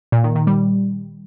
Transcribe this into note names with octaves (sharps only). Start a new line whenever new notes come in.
A#2
D#3
D#3
G3